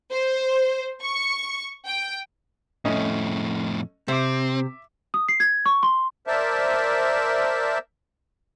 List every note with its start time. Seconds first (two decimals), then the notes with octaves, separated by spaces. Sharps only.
0.11 C5
1.02 C#6
1.85 G5
2.85 F2 A2 A3 C#4 D#5
4.08 C3 C4 E5 D6
5.14 D#6
5.29 C7
5.40 G#6
5.66 C#6
5.83 C6
6.27 A#4 C5 D5 E5 A5